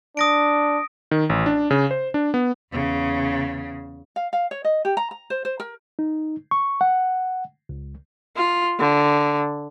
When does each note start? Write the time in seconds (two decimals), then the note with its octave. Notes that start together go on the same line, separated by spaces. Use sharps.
0.17 D4 D#6 A#6 D7
1.11 D#3
1.30 A1
1.46 D4
1.71 C#3
1.91 C5
2.14 D4
2.34 B3
2.71 E2 C#3
4.16 F5
4.33 F5
4.51 C#5
4.65 D#5
4.85 G4
4.97 A#5
5.11 A#5
5.30 C5
5.45 C5
5.60 A#4
5.99 D#4
6.51 C#6
6.81 F#5
7.69 C#2
8.36 F4
8.80 D3